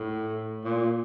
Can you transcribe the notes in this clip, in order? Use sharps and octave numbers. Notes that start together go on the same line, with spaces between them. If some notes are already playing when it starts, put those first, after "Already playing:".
Already playing: A2
A#2